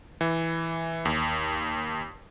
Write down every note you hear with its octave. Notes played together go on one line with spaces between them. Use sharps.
E3
D#2